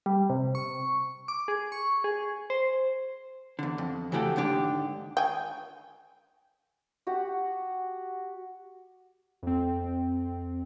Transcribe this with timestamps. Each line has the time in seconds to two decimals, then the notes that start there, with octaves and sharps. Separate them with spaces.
0.06 G3
0.30 C3
0.55 C#6
1.28 D6
1.48 G#4
1.72 C#6
2.04 G#4
2.50 C5
3.59 E2 D3
3.78 F2
4.12 C#3 E3 A3 F#4 G4 A4
4.36 D#2 G#2 D3 D4 G4
5.17 G5 G#5
7.07 F#4 G4 F#5
9.43 F2 C4